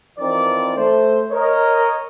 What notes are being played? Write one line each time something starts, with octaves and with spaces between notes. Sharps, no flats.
E3 F3 C4 D#4 A#4 D5
A3 C5
A#4 C#5 D#5